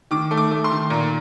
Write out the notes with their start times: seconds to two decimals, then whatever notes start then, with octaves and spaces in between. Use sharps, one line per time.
0.11 D#3 D6
0.31 A3
0.37 D6
0.51 A3
0.64 C6
0.71 D#3
0.90 A#2 A#5